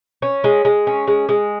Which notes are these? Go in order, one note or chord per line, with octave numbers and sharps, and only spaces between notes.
C#4
G#3
G#3
C#4
G#3
G#3